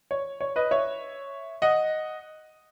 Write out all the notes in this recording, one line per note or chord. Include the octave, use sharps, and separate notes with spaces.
C#5
C#5
B4 D#5
C#5 E5
D#5 F#5